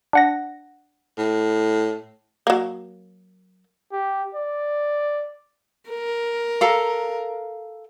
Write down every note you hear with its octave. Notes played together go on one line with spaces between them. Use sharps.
D4 F#5 A#6
A2
F#3 A#3
G4
D5
A#4
A4 F5 A#5